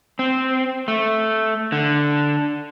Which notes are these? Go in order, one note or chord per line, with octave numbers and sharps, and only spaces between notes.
C4
A3
D3